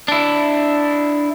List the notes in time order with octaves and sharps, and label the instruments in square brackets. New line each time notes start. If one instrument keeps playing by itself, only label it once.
[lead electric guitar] D4 E4